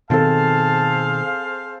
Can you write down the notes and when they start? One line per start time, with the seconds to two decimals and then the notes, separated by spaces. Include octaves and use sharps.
0.10 B2 D#3 C4 G#4 A4 C5 F5 A5